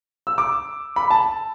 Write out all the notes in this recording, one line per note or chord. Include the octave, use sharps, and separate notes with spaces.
E6
D6
B5
A5